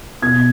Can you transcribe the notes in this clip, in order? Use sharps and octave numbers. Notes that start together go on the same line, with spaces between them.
B2 G#6